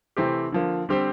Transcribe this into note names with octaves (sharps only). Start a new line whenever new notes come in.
C3 E3 A3 C4 G4
D3 F3 A#3
D3 G3 C4 G4 C5